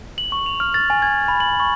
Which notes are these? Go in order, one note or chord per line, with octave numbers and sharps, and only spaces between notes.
F#7
C#6
F7
F6
A6
G#5
G#6
B5
F#7
C#6